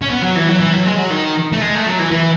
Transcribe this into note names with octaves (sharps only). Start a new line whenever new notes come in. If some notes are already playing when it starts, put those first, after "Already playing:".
C#4
B3
F#3
E3
F#3
E3
F#3
G#3
F#3
D#3
A3
G#3
A3
F#3
E3
E3